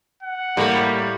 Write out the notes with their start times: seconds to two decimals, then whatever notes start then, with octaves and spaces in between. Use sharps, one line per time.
0.23 F#5
0.57 A2 G3 A#3 C#5